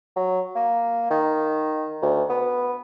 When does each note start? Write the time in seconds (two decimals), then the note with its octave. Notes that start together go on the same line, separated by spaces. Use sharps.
0.16 F#3
0.55 A#3
1.10 D#3
2.02 D2
2.30 B3